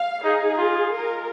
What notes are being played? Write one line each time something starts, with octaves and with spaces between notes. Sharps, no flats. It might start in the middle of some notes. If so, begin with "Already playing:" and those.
Already playing: F5
D#4 G#4
F4
A#4